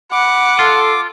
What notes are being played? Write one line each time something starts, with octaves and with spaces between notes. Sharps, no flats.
F#5 B5 D6
F4 A4